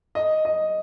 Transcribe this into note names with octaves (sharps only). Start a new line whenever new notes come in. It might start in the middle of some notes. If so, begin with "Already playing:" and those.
D#5
D#5